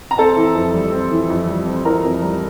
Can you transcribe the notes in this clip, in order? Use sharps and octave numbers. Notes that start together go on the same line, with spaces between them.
A#5
C4 A4 A5
E3
F2
G3
C4
E3
F2
G3
C4
E3 A#4 A#5
F2
G3